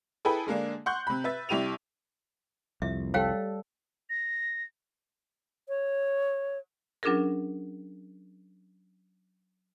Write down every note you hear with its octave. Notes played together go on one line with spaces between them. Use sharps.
E4 G#4 A4 B4 G5 B5
D3 G#3 A#3 D4
F#5 C6 C#6 F#6 G6
C3 B5
B4 E5 A6
C2 E4 G4 D#7 F7
C2 F2 E5
G3 A4 C#5 F5 G5
A#6
C#5
F#3 C#4 D4 F4 G#4 A#4